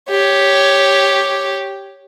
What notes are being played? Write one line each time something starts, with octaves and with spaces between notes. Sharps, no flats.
G4 C#5